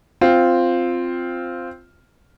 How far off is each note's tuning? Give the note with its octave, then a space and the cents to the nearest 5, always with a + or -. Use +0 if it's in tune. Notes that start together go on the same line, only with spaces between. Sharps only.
C4 +0 F4 +0